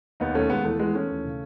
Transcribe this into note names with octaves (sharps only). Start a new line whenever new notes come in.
D#2 B3 D#4
D#3 A3 C#4
D#2 G#3 B3
E3 A3
E3 G#3 B3
E3 A3 C#4
D#2
C#3